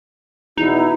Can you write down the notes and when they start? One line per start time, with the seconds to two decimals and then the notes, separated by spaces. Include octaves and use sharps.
0.57 E2 B2 D#4 E4